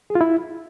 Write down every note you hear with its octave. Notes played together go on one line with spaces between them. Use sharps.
G#4
F4
E4